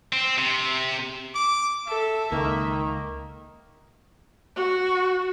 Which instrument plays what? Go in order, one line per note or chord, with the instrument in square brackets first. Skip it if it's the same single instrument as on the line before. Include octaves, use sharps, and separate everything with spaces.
[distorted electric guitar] C4
C3
[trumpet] D6
[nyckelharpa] A4 [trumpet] E5
[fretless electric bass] C#2 [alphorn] D#3 [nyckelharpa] A#3
[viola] F#4